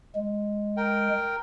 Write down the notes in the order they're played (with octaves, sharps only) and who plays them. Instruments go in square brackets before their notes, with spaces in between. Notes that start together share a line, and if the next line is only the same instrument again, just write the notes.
[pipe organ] G#3
[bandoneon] A#4 G5